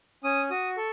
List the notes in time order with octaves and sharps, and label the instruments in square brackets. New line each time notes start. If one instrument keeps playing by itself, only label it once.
[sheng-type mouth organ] C#4 D#6
F#4 D#6
A4 C#6